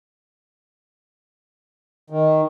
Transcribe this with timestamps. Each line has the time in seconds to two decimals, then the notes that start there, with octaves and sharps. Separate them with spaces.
2.10 D#3